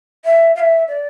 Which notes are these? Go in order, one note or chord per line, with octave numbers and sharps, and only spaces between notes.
E5
F5
E5
D5